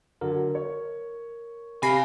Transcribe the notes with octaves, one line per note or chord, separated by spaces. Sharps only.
D3 F#3 A#4
C#5
C3 F5 G#5 B5 A#6 C7